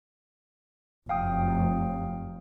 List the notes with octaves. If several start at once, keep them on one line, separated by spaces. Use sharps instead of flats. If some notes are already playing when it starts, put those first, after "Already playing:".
F1 F#2 F5 G5 D#6